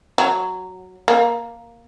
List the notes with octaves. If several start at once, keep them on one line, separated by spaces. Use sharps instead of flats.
F#3
A#3